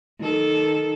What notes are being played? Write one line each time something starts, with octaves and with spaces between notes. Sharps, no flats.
D#3 A4